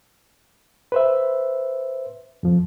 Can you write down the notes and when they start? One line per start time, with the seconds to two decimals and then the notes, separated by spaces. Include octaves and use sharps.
0.92 B4 C5 E5
2.43 F2 F3